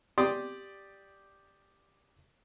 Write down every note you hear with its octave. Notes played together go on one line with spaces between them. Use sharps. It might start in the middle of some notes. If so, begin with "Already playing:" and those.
G4 D5 C6 D#6